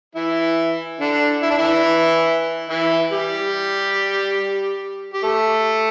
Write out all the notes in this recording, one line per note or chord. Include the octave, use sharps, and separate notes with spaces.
E3 E4
D3 D4
E4
D4
E3 E4
E3 E4
G3 G4
G4
A3 A4